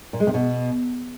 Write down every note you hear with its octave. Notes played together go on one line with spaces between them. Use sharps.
A#2
G#3
C3
B2